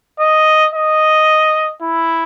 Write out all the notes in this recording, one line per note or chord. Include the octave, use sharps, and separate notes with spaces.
D#5
D#5
E4